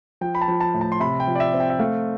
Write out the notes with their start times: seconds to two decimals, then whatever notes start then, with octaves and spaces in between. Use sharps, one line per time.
0.21 F3 G5
0.35 B5
0.41 A5
0.48 F3
0.60 A5
0.74 A2
0.81 A5
0.92 C6
1.00 C3 B5
1.20 G5
1.27 F3
1.35 D5
1.40 E5
1.54 C4
1.60 G5
1.70 E5
1.79 A3 F5